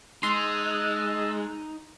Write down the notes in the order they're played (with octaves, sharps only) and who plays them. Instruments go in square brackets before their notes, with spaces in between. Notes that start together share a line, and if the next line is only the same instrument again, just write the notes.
[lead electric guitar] G#3 [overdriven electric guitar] D#4 [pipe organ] D#5 A5 E6 [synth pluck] C6